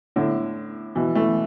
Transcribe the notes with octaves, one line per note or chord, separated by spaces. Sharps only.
A2 D3
B2 E3
E3 A3